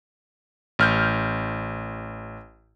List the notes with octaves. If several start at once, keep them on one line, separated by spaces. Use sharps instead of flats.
A1 F6 G6